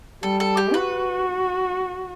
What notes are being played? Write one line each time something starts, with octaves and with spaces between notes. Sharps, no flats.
G3 A4
A4
G4
F#4 B4